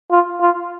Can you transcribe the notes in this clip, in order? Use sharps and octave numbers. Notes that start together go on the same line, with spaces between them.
F4
F4